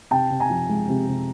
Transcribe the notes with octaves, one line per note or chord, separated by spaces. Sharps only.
C3 G5 A5
C3
G#5 A#5
F3
G#3
C3
C3